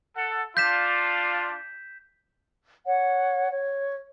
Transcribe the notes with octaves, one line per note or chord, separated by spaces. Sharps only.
A4 F#5
D4 F4 G6 B6 E7
C#5 F#5
C#5